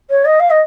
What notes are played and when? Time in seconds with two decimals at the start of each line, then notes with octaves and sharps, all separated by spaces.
0.10 C#5
0.25 D#5
0.39 F5
0.50 D#5